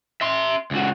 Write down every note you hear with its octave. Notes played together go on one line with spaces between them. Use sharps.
E5 C6
C#2 F#4